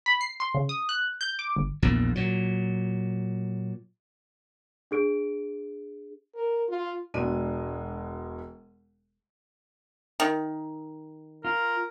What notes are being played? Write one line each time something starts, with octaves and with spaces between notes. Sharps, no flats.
B5
C7
C6
C#3
D#6
F#6
G6
D6
G1
A#1 E2 A#2
A#2 F#3
D4 G#4 D7
A#4
F4
E1 B2 G#3 D4 D#7
D#3
F4 A#4